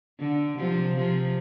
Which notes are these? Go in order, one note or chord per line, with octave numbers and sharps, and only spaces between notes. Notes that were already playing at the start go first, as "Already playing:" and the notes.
D3
C3 F3
C3 F3